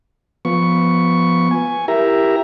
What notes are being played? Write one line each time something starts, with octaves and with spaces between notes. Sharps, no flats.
F3 B3 C#6
G#5
E4 G4 A#4 E5 A#5